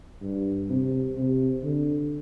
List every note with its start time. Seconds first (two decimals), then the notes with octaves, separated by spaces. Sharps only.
0.22 G2
0.69 C3
1.17 C3
1.64 D3